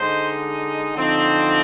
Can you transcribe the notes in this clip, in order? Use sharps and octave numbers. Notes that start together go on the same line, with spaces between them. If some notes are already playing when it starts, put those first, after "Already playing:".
Already playing: D3 G#3 D#4 C5
D3 F3 C4 D#4